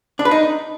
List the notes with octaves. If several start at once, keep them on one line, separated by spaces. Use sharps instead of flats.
D4
B4
D#4